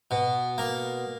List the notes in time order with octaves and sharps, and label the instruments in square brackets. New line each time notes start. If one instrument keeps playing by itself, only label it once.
[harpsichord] B2
A#3